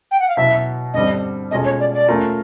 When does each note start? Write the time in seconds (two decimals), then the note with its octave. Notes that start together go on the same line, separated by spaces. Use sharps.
0.11 G5
0.20 F#5
0.28 F5
0.37 B2 F#3 B3 E4 E5
0.94 G2 D3 G3 C4 D#5
1.51 B2 G#3 C#4 F4 A4 D#5
1.65 C#5
1.80 D5
1.94 D5
2.08 A3 C#4 F4 A#4